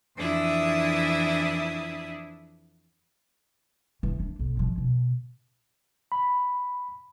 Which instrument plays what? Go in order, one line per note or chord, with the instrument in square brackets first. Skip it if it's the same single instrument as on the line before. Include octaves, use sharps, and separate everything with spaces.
[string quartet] F2 E3 D4 E4 E5 D#6
[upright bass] E3
D4
B1
G#2 F3
B2
[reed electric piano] B5